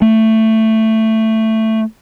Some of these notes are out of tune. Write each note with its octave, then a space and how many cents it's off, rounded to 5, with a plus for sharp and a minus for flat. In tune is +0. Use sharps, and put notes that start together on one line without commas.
A3 +10